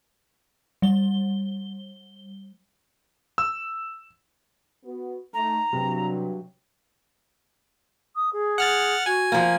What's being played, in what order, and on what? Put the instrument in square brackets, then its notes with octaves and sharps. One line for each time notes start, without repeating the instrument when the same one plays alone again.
[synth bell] G3 G7
[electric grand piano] E6
[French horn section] B3 F#4
[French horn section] A3 D#4 [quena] A#5
[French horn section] G2 F#3 [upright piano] C3
[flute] D#6
G#4
[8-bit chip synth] F#5 F6 A6
[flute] F#4 [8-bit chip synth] G#5
[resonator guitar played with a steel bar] F3 A#3